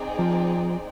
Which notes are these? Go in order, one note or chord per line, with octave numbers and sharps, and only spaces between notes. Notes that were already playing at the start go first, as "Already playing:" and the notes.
Already playing: C4 D#4 G#4 D5 G5
F3